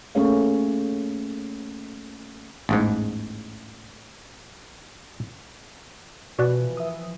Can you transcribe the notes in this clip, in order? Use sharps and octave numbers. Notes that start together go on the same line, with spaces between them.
A3 A#3 C#4 G#4 C#5 F5
A1 E2 G#2
B2 E3 F3 F#4 B4 D5 F#6
E5 D#6